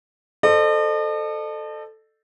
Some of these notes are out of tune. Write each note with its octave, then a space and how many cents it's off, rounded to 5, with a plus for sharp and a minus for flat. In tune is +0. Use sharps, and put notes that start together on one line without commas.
A4 +0 C5 +0 D#5 -45